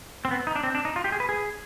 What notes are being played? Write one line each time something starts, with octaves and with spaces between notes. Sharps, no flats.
C4
B3
D#4
D4
C4
D4
D#4
F4
G4
G#4
B4
G#4